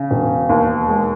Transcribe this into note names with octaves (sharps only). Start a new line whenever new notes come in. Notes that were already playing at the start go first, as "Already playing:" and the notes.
Already playing: C#3
E1
D#2
G#3